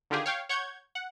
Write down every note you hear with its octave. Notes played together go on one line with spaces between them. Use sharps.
D3 D#3 F4 G4 G#4
C#5 F5 G5
C#5 F#5 C#6 G6 G#6
F#5